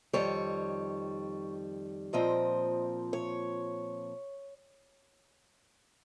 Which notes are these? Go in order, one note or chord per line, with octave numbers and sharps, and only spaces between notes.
F2 D#3 G3 C#5
A#2 F3 C4 D#5
C#5